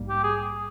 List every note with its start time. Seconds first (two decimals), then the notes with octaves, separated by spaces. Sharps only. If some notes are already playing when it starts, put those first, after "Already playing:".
Already playing: A#1 G#2 G3 A#3
0.09 G4
0.24 G#4